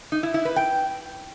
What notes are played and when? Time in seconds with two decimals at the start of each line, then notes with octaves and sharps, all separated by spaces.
0.12 D#4
0.23 E4
0.34 E4
0.45 B4
0.56 G5